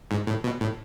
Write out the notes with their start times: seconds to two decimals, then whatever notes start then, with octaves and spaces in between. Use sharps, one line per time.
0.11 G#2
0.27 A2
0.44 B2
0.61 A2